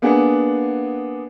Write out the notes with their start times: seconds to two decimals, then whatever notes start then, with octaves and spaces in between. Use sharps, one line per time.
0.02 A#3 B3 D4 G#4 F#5